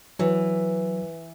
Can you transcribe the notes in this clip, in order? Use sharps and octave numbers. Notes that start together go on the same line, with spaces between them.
E3 F#3